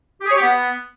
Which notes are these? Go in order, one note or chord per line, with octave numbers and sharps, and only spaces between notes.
G4
G#4
C#5
G4
B3